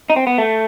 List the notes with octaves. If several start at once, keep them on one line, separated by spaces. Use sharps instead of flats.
D#4
C4
B3
A3